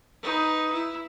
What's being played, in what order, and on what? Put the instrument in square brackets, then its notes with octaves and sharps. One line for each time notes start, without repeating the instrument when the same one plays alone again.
[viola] D#4 B4
E4